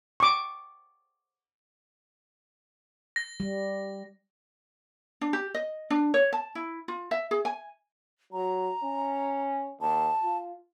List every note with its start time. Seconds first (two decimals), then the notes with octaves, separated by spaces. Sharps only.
0.20 C#6 D6
3.16 A#6
3.40 G3
5.21 D4
5.33 G4
5.54 D#5
5.90 D4
6.14 C#5
6.33 A5
6.55 E4
6.88 F4
7.11 E5
7.31 G#4
7.45 G#5
8.33 F#3 A#5
8.83 C#4
9.81 D#2 A5
10.23 F4